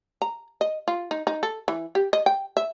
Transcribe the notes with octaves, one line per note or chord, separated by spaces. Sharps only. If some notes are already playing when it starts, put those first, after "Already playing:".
A#5
D#5
F4
D#4
D#4
A4
E3
G4
D#5
G5
E5